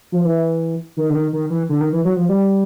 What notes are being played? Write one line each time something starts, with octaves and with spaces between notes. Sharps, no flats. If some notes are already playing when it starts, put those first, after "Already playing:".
F3
E3
D#3
D3
D#3
D#3
E3
D3
D#3
E3
F#3
F3
G3